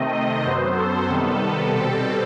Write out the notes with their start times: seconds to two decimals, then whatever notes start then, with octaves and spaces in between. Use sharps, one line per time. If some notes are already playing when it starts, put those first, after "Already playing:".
Already playing: C3 D#3 A3 C4 D#5
0.13 D#5
0.45 F#2 F#3 B3 C5
0.77 A4
1.09 C3 D#3 G3 B3 A4
1.73 B2 G3 C4